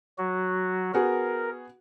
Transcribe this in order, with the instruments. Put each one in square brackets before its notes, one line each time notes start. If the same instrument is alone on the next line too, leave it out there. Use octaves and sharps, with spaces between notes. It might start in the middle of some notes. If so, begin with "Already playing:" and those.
[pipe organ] F#3 F#4
[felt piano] B3 F#4 G#4 [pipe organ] A#4